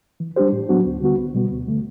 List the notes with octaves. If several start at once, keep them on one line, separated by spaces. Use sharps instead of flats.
E3
G3 D4 G4 C5
A2
F#3 B3 D4 F#4
D2
D3 G3 B3 F#4
C2
B2 G3 B3
D2
D3 A3